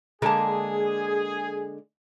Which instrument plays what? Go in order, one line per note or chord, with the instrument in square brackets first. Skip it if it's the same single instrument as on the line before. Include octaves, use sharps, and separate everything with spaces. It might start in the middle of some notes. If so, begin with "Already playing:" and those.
[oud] D3 G#3 A#3 [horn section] G#4 [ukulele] A#4 A5